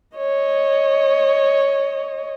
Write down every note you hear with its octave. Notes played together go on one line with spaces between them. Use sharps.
C#5 D#5